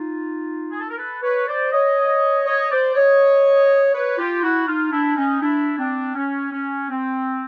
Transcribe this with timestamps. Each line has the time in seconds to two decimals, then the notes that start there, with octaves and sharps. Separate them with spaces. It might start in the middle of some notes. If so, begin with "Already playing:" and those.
Already playing: D#4 F4
0.71 G#4
0.79 A4
0.89 A#4
0.97 A4 B4
1.22 B4 C#5
1.47 C5 D5
1.72 C#5 D#5
2.46 C#5 D#5
2.71 C5 D5
2.95 C#5 D#5
3.93 B4 C#5
4.18 F4 G4
4.43 E4 F#4
4.67 D#4 F4
4.91 D4 E4
5.16 C#4 D#4
5.41 D4 E4
5.78 C4 D4
6.15 C#4
6.52 C#4
6.89 C4